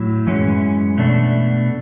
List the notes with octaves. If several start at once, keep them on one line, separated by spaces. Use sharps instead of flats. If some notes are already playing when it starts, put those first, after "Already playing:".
Already playing: A2 F#3 E4
F#2 E3 G#3 C#4
B2 A3 D4